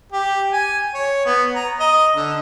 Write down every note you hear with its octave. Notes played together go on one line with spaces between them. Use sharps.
G4
G#5
C#5
B3
A#5
D#5
D3